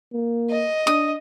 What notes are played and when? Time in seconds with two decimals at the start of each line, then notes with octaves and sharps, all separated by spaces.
0.13 A#3
0.50 D#5
0.87 D4 D#6